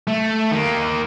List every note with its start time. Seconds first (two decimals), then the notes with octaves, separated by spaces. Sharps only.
0.08 A3
0.52 D#3 A#3